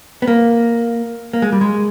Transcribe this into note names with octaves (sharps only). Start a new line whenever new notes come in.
B3
A#3
A#3
G#3
G3
G#3